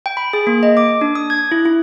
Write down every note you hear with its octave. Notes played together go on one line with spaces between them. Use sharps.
G5
B5
G#4
A#3
D#5
D6
D4
D#6
G#6
E4
E4